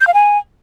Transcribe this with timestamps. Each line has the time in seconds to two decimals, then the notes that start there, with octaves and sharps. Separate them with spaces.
0.01 G6
0.07 F5
0.14 G#5